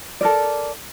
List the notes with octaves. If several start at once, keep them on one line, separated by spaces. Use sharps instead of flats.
A4 A#4 D5